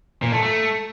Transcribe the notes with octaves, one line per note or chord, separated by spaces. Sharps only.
A#2
A3
A3